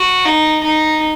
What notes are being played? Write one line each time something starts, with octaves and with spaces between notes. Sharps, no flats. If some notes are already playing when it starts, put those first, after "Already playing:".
Already playing: F#4
D#4
D#4